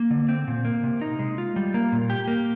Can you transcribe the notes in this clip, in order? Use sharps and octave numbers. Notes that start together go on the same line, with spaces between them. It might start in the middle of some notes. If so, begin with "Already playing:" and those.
Already playing: A#3
D3
C4
A#2
A#3
C3
D#4
G#3
F4
G3
A#3
A#2
G4
A#3